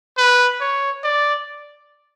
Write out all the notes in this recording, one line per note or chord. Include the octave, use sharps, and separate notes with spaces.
B4
C#5
D5